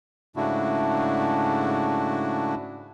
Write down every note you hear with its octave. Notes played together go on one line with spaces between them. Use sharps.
G#2 C#3 A3 D4 E4 F#4